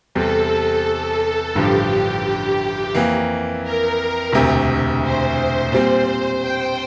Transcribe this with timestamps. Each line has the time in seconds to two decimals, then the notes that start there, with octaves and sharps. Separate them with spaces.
0.15 E2 C3 G3 C4 A4
1.55 A1 G2 D3 F3 G4
2.95 F2 E3 A#3
3.63 A#4
4.32 E1 D2 C3
5.03 C5
5.72 A#2 G3 C4 C5
6.42 G5